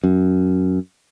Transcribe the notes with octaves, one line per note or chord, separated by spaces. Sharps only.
F#2